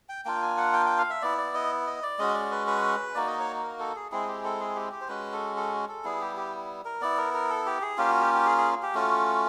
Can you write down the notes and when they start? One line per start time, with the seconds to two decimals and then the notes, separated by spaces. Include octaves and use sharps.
0.09 G5
0.25 A#3 D4 F4 G5
0.42 G#5
0.57 F#5
0.73 G5
0.86 G5
0.98 F5
1.10 E5
1.22 B3 E4 D5
1.38 D5
1.55 D#5
1.87 D#5
2.03 D5
2.19 G#3 C#4 F#4 D#5
2.34 D5
2.51 B4
2.67 B4
3.15 A#3 D#4 F#4 D5
3.27 D#5
3.39 C#5
3.63 A#4
3.79 A4
3.96 G#4
4.12 G#3 C4 E4 G#4
4.28 G4
4.44 A4
4.60 G#4
4.76 G4
4.92 G4
5.01 C5
5.08 G#3 C#4 F#4 B4
5.32 A4
5.56 A4
5.89 A4
6.04 G3 B3 E4 G#4
6.21 G4
6.37 G4
6.85 A#4
7.01 B3 E4 D5
7.18 A#4
7.34 A#4
7.50 A4
7.66 G4
7.82 G#4
7.97 A#3 C#4 F4 G4
8.10 F#4
8.21 G4
8.35 G4
8.46 G#4
8.58 G#4
8.82 G4
8.95 A3 C#4 F4 F#4